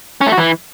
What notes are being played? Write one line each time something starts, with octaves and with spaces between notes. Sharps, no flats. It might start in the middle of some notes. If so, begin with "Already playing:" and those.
C#4
A3
F#4
E3